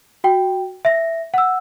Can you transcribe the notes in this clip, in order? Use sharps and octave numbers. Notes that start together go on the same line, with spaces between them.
F#4 G5
E5 A#6
F#5 E6